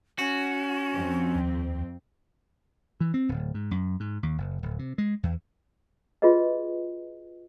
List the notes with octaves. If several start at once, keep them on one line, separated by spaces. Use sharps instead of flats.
C#4 F#4
F2 C4
D#2
E3
C4
D1
G#2
F#2
G#2
D#2
F#1
D1
C3
G#3
E2
F4 F#4 G#4 B4 D#5